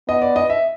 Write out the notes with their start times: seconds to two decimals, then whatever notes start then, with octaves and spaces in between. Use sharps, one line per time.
0.09 B3 D#5
0.22 D5
0.36 D#5
0.50 E5